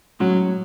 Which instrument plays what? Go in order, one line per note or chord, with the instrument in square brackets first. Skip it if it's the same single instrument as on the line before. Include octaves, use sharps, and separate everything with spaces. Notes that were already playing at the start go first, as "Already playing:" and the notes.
[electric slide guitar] A2 G#3 C#4 F#4 [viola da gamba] F#3